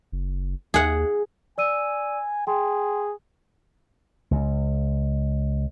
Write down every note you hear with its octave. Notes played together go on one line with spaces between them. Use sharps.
F#1
D#2 G#4 F#5
D5 G#5 E6 D#7
G#4 G5 C6
C#2